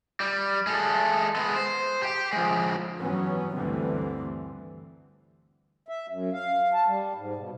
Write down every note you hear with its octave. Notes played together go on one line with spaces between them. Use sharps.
G3
G#3 A4
G#3 B3
C5
G4 G5
F3 G#3
G2 E3 F#3 B3 C#4
D2 G2 D3 E3 G3 C4
E5
F#2
F5
A5
G3
G#2
B2